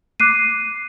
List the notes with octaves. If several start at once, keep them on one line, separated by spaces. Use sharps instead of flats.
D6 F#6 C7 D#7